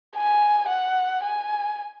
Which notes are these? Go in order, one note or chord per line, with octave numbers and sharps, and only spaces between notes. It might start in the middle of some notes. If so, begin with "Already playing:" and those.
G#5
F#5
G#5